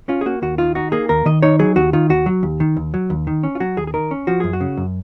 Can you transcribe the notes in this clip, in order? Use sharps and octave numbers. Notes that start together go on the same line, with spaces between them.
C#4 F4
G#4
A#3 F#4
D#2 F#4
D#3 F4
D#4 F#4
A#3 G#4
D#2 A#4
D#3 D#5
D#4 C#5
F#3 G#4
D#2 F#4
D#3 F4
D#2 F#4
F#3
D#2
D#3
D#2
F#3
D#2
D#3
C#4
F4
F#3 F#4
D#2 G#4
G#4
D#3 A#4
C#4
F3 F#4
F#2 G#4
F#4
C#3
F#2